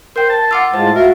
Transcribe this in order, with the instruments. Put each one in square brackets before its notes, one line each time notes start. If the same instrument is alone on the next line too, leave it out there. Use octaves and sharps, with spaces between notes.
[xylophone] A#4 G5 [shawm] C5
[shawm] A5
[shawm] F4 [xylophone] F#5 D6 E6
[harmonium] A2 G#3 F4 [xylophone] C5 [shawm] A5
[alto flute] F#4 [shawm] A#4 [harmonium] E5 F5